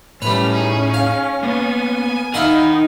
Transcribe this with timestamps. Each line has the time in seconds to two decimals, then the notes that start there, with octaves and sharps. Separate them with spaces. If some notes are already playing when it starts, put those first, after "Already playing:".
0.22 A2 G3 A3 C#4 B4 F7
0.51 D#4 G#4
0.94 F5
1.43 A#3 B3 G#5
2.34 D#4 E4 A#4 D#5 F5 F#5 A#5